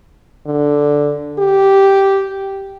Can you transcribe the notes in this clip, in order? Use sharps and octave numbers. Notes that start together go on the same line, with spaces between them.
D3
G4